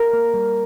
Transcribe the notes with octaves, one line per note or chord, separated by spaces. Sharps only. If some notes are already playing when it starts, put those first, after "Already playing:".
Already playing: A#4
A#3
G3